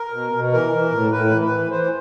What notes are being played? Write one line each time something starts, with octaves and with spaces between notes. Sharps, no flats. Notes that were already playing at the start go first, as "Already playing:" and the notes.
Already playing: A#4
B2
B2
E3 A#4
E3
A2
A2 B4
E3
B4
E3
E3 C5